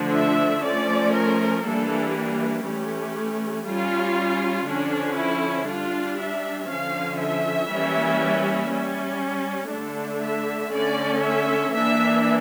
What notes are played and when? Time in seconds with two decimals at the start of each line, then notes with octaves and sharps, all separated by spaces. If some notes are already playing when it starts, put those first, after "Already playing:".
Already playing: D3 F3 A3 D4
0.13 E5
0.64 F3 A3 C#4 D5
1.14 A#4
1.65 E3 G3 A#3 D4 A4
2.16 G4
2.66 E3 A3 C#4
3.66 G3 C#4 F4
4.67 D3 F3 C#4 D4
5.18 E4
5.68 G3 D4 F4
6.19 E5
6.69 D3 F3 C#4 F5
7.20 E5
7.71 E3 G3 A#3 C#4
8.71 G3 C#4
9.72 D3 A3 D4 A4
10.23 E5
10.73 D3 A3 C#4 D5
11.24 E5
11.74 E3 A#3 D4 E5